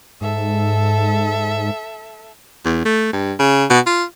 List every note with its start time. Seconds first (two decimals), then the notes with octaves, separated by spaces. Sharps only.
0.21 G#2 A4 E5
2.65 E2
2.85 A3
3.13 G2
3.39 C#3
3.70 B2
3.86 F4